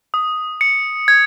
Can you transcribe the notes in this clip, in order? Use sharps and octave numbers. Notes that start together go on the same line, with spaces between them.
D#6
C#7
G#6